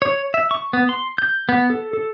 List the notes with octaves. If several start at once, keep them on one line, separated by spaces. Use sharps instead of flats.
C#5
E5
C#6
B3
C6
G6
B3
A4
A4